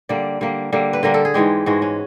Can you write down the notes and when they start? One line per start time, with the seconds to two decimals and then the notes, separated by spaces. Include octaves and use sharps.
0.09 D3 G3 A#3 D5
0.41 D3 G3 A#3
0.72 D3 G3 A#3
0.93 B4
1.03 D3 G3 A#3 A#4
1.14 A4
1.25 G#4
1.34 G#2 E3 G#3 G4
1.66 G#2 E3 G#3 F#4
1.82 C#4